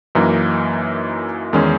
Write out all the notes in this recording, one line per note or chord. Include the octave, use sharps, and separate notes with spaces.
F#2 E3 A#3 D#4 A#4
E2 D#3 G#3 C#4